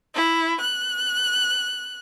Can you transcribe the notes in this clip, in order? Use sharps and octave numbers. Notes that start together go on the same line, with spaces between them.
E4
F#6